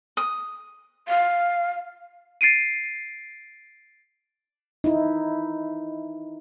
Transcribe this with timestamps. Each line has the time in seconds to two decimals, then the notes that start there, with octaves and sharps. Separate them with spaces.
0.17 D#6
1.08 F5
2.41 A6 C7 D7 D#7
4.84 D#4 E4